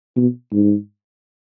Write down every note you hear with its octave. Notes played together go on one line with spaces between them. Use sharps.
B2
G#2